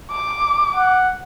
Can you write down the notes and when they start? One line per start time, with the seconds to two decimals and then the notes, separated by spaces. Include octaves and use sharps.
0.11 D6
0.75 F#5